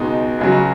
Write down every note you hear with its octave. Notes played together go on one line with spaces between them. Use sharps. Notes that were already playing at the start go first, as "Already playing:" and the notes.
Already playing: C#2 B2 G#3 D#4
C#2 C#3 F#3